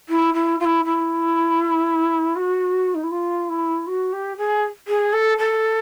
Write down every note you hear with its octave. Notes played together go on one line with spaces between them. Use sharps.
E4
E4
F4
E4
E4
F#4
D#4
E4
F4
E4
F#4
G4
G#4
G#4
A4
A4